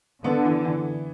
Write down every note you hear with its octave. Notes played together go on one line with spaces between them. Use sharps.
D3 B3
E3
E3